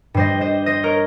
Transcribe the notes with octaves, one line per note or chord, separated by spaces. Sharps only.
G2 G3 C5 D#5
C5 D#5
C5 D#5
A#4 C#5